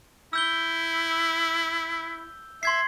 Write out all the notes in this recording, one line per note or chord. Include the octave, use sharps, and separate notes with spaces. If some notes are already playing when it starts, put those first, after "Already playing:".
E4 E6 G6 G7
E5 C6 G#6 C7